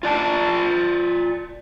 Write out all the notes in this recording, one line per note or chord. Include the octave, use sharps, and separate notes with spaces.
F4 D5 A5